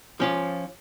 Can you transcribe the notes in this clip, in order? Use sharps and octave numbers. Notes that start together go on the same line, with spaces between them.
F3 C#4 F4